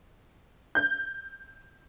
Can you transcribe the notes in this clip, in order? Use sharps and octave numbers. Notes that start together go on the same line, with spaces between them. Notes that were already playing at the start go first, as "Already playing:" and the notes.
G6